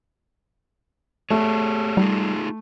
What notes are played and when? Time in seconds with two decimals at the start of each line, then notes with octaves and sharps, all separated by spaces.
1.30 A3 G4 G#4 C#5
1.97 G3 D#4 F4 G#4